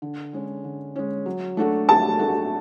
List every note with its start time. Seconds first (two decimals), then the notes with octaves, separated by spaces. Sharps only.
0.02 D3
0.33 G#3 C#4
0.64 D3
0.96 G#3 C#4
1.26 F#3
1.57 A3 D4 F#4 A4
1.88 F#3 A5
2.19 A3 D4 F#4 A4